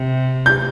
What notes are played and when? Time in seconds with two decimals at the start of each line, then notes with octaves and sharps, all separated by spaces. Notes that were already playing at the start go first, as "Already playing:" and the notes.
Already playing: C3
0.46 G6